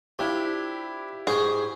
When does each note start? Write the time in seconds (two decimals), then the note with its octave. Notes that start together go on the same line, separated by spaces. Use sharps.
0.19 C4 D4 E4 F4 G4
1.27 G#2 G#4 C5 C#6